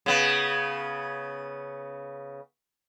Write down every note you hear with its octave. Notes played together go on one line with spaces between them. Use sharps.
C#3 B3